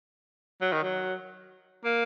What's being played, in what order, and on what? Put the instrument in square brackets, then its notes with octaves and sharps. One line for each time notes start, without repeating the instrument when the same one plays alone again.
[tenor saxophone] F#3
D#3
F#3
A#3